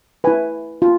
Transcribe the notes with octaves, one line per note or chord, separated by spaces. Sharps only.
E4 B4 G#5
F4